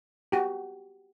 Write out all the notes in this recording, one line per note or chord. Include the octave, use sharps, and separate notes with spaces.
F#4 G4